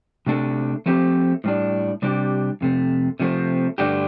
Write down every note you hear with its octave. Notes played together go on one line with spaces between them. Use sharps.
C3 A3 D4 A4
F3 A3 C4 G4
A2 G3 D4
C3 G3 D4 G4
F2 C3 A3
C3 F3 A3 C4
G2 D3 A3 D4 G4